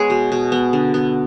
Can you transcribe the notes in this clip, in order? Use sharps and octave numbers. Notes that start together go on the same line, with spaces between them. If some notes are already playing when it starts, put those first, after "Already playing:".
Already playing: G#3 B3 G#4 B4 C#5
B2
B2
B3
D3
B3